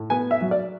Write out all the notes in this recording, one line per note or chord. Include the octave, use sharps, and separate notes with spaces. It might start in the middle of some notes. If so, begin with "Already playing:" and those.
Already playing: A2
B3 G#5
E5
F#3
D5